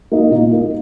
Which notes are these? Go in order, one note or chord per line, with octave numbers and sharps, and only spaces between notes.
A#3 D#4
A#2
A#3 D#4